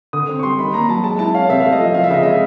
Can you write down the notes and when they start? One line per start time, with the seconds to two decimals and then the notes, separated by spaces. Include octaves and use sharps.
0.13 D3 D#6
0.29 C4
0.39 C#6
0.43 G3 C6
0.59 D#3 B5
0.74 A#3 A#5
0.89 F#3 A5
1.04 G#3 A5
1.19 E4 A5
1.34 C#4 F5
1.49 C3 E5
1.61 A3 F5
1.72 D#5
1.80 F3 E5
1.94 F3 F5
2.04 E5
2.10 C#3 D#5
2.23 G#3 E5